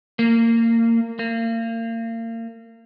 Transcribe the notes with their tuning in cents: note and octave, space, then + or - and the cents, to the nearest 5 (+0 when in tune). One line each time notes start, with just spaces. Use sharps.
A#3 -25
A#3 -35